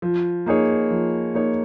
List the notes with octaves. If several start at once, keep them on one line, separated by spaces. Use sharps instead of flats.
F3
A#3 D#4 G#4 C#5
F3
A#3 D#4 G#4 C#5